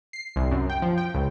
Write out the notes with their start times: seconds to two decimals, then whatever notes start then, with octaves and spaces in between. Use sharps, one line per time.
0.13 C7
0.36 C2
0.51 F#2
0.70 G5
0.82 F3
0.98 G5
1.14 C#2